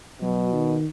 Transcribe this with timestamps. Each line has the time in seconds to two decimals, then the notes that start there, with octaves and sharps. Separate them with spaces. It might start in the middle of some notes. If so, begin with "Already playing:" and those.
0.22 B2 F#3
0.53 D#3